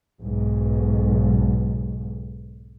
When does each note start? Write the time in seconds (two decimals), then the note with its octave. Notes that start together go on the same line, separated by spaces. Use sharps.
0.21 B1 G#2